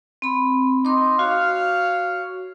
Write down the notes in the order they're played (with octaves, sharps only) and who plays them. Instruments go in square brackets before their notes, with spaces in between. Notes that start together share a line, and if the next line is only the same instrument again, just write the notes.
[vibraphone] C4 B5
[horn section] D#4 [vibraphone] C6 D6
[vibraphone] F#4 [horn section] C#5 F5